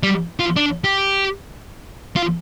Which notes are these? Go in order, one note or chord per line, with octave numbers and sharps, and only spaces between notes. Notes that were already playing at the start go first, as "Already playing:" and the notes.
G3
F4
D4
G4
F4